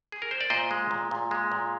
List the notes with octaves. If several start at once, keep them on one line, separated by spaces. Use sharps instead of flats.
G#4
A#4
C5
D5
A#2 C5 D#5
G#3
A#2
A#2
G#3
A#2